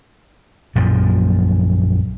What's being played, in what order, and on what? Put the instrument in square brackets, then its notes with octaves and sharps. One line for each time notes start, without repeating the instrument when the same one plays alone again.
[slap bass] A#1 F#2 A#2 F3